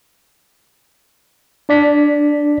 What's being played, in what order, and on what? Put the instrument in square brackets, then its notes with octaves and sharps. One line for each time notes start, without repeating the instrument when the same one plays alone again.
[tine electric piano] D4 D5 B6